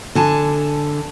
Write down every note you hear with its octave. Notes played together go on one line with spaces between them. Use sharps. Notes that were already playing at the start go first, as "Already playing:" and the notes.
D3 G#5 A5